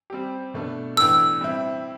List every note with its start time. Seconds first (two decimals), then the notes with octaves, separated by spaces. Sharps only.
0.10 G3 C4 G4
0.54 B2 A3 D4 A4
0.97 A2 E3 B3 D4 A4 E6
1.41 G3 C4 E4